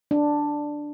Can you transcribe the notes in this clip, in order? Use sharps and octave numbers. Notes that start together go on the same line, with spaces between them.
D4